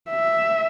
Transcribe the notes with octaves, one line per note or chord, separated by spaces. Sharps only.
E5